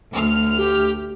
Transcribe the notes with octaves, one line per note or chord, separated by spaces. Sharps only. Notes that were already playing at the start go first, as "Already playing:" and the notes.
D2 F6
G4